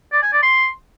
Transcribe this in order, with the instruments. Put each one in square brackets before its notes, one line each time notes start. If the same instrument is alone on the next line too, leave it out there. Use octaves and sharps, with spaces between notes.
[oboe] D5
G#5
D5
C6